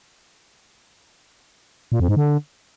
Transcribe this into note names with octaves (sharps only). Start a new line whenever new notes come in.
A#2
F2
G#2
D3